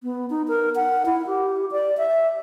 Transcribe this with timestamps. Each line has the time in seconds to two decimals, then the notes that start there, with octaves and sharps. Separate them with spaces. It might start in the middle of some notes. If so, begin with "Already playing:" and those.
0.03 B3
0.30 D#4
0.48 A#4
0.76 F#5
1.06 E4
1.27 G4
1.72 D5
1.98 E5